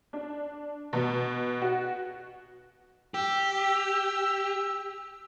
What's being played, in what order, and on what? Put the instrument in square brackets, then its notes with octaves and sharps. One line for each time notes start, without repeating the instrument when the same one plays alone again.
[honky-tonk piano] D4
B2
F#4
[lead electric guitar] G4 [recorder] E6